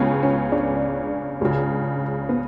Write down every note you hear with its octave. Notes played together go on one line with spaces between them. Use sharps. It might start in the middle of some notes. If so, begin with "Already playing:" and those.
Already playing: C#2 C#3 B3 C#4
C#4
D4
C#2 C#3
B3